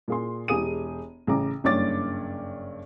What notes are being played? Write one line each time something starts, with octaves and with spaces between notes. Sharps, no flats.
A#2 G#4 C6
E1 G4 G#4 D#6 D#7
A1 C#3 G#4 A#5 D6
F#1 G2 C#4 C#5 D6 A6